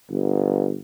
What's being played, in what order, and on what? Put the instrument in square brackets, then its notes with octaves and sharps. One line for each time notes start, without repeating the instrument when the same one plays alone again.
[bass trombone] G1